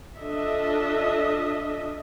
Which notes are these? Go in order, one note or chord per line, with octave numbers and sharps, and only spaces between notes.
D4 F4 A4 D#5 E5